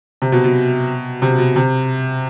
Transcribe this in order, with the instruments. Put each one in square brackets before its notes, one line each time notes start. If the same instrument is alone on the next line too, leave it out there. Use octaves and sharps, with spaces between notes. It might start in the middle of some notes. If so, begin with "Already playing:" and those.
[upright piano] C3
B2
B2
C3
B2
C3